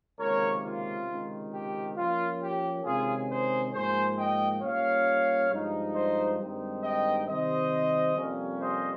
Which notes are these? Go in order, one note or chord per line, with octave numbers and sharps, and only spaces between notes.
C#2 C3 D#3 A#3 C#4 A#4 C#5
F4
C#2 C3 D#3
G4
A#2 F3 A#3 C#4 F4
G4
C3 D#3 G#3 C#4 F4 G#4
G#4 C5
G#2 F3 A#3 G#4 C5
D#5 G5
A#2 G3 C#4 C#5 F5
G2 F3 G#3 D#4
C5 D#5
G2 D#3 G#3 C4 D#4
D#5 G5
C3 D#3 G3 C4 C5 D#5
F2 C3 G3 A#3 C#4
C5 D#5